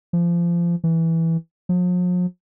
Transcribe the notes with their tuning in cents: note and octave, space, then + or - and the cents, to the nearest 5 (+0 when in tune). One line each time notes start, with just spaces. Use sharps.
F3 -25
E3 -5
F3 +45